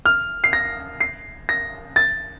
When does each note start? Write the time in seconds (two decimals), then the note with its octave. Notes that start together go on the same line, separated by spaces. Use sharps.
0.06 F6
0.44 C7
0.53 A#6
1.00 C7
1.49 A#6
1.96 A6